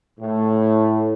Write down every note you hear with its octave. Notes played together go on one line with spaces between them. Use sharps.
A2